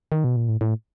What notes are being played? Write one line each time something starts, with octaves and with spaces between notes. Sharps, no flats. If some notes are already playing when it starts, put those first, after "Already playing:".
D#3
B2
A#2
A2
A2